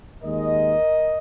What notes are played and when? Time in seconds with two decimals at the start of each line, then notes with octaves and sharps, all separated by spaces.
0.23 D#2 D#3 G#3 A#4 D#5